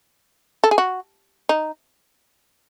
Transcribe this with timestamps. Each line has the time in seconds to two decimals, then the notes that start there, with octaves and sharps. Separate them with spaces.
0.64 A4
0.71 G#4
0.78 F#4
1.49 D#4